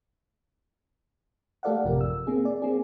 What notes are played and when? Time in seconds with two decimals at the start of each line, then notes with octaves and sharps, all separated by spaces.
1.63 A3 G4 A4 D5 F5 F#5
1.84 A1 F#2 C3 F3 G4 A#4
2.01 E6
2.27 A#3 C4 G#4
2.45 D5
2.62 A#3 C4 G#4